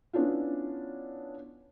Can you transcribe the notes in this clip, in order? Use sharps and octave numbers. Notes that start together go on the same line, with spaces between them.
B3 C#4 D4 E4 F4